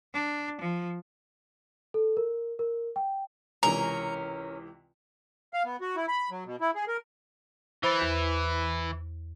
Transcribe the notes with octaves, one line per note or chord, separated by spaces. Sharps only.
D4
F3
A4
A#4
A#4
G5
C#2 C3 E3 C#4 A#4 A#5
F5
B3
F#4
E4
B5
F#3
B2
E4
G#4
A#4
E3 C5 B5 A6
E2 G6